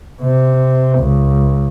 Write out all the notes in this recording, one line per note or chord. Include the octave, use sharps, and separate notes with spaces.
C3
C#2